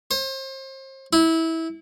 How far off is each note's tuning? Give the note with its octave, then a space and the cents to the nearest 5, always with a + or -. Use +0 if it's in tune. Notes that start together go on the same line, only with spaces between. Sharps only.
C5 +35
E4 -20